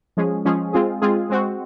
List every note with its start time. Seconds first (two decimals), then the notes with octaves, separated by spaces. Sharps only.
0.17 F3 G#3 C#4 G#4
0.45 F3 G#3 C#4 G#4
0.73 G#3 C4 F4 G#4
1.02 G#3 C4 F4 G#4
1.30 G#3 C4 F#4